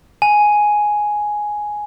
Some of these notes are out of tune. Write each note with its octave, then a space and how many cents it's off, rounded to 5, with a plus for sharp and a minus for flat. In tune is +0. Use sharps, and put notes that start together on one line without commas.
G#5 +5